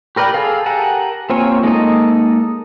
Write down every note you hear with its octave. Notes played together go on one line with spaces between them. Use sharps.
G4 A#4 B4 D5 G5
G#4 A4 F5
G4 A#4 F#5 G#5 A5
A#3 C4 F4 C#5 G#5
G#3 A#3 D#4 A4 D#5